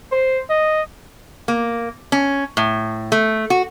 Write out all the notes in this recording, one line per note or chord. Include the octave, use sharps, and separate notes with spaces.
C5
D#5
A#3
C#4
A2
A3
F#4